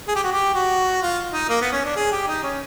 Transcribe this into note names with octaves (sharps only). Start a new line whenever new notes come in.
G#4
G4
F#4
G4
F#4
F4
D#4
A#3
B3
C#4
D4
G#4
G4
D#4
C#4